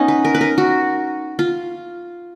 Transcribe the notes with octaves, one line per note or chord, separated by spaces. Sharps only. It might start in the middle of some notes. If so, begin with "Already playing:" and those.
Already playing: B3 C#4 D#4
B4
A#4
B4
A#4
F#4
F4